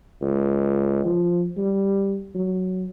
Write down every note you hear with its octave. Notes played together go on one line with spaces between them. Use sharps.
C#2
F3
G3
F#3